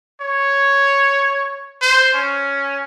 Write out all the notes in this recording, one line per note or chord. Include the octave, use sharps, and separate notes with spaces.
C#5
C5
C#4